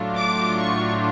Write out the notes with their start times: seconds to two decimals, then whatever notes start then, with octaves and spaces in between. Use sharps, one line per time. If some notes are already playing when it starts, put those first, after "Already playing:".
Already playing: A2 F#3 A3 D4 F4
0.16 D6
0.61 C#6